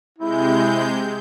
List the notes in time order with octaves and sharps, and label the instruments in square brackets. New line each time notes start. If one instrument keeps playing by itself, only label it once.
[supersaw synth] C3 G#3 G6 [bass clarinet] E4